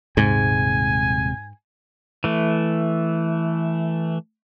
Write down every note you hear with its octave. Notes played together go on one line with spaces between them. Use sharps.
D#1 G#2 C3 G#3 G#5
E3 A3